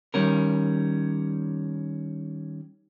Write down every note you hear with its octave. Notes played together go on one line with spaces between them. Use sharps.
D#3 G3 C#4 A#4